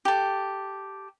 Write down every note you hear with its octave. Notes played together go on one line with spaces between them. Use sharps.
G4 A4